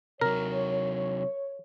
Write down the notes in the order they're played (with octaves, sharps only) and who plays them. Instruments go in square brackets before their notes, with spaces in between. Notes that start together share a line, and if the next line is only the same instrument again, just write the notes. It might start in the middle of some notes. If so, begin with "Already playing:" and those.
[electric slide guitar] C3 F#3 [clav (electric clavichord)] A#4 [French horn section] C#5